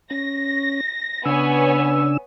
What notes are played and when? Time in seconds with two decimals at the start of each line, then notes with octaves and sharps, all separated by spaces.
0.11 C#4 A#6
1.25 C#3 B3 D4 C#5 G#5 E6